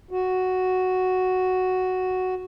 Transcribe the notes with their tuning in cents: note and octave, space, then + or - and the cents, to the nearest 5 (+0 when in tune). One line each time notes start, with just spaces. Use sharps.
F#4 +0